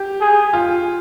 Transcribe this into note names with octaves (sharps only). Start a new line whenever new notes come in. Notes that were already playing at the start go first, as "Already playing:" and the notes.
Already playing: G4
G#4
F4